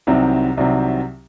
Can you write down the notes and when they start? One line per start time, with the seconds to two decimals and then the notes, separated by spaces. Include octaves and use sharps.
0.07 C2 C3 D#3 F#3 C4
0.57 C2 C3 D#3 F#3 C4